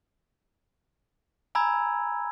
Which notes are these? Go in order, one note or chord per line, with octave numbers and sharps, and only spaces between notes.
G#5 A#5 B5 E6 G#6